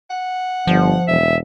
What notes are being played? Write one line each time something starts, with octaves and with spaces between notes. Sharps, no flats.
F#5
G1 F3
E1 E5